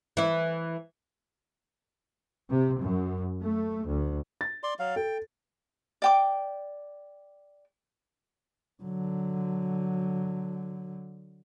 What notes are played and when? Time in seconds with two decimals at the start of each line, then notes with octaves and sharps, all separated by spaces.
0.17 E3 E4
2.49 C3
2.81 F#2
3.40 A3
3.86 D2
4.41 A6
4.63 D5 C6
4.79 F#3 F5
4.96 A4 G5
6.02 D5 G5 D6
8.83 D3 F#3